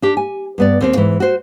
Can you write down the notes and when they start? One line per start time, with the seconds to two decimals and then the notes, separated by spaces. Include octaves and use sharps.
0.02 D4 G4
0.17 G#5
0.58 G2 B3 D5
0.81 D#2 C4 C5
0.96 G#2 E3
1.20 F#4 C5